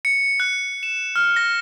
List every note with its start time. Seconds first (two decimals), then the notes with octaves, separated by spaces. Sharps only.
0.05 C#7
0.40 F#6
0.83 E7
1.16 F6
1.36 A#6